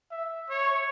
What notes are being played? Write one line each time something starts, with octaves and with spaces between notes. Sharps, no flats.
E5
C#5